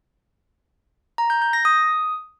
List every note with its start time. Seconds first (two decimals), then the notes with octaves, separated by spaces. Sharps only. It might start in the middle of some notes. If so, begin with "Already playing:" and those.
1.18 A#5
1.30 G6
1.42 G6
1.53 A#6
1.65 D#6